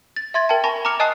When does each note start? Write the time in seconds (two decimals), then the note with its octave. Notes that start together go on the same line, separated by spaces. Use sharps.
0.16 A6
0.34 E5 C6 G#6 A6
0.49 A#4 G5 A5
0.64 G#5 A5 B5 C#6 A#6
0.85 A#5 D6 F6 C#7 F7
1.00 D#5 G#5 A5 D#6 F#6 C7